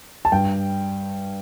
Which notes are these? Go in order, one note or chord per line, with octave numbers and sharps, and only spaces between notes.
A5
G2 G5